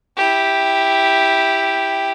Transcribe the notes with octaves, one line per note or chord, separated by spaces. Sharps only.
E4 G4